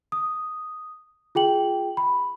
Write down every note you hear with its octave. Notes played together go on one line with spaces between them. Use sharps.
D#6
F4 G#4 G5 F#7
B5